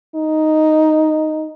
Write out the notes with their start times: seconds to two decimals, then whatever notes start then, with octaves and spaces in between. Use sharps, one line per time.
0.15 D#4